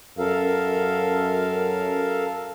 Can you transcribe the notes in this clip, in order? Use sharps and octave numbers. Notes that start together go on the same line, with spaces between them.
F#2 A4 A#4 F5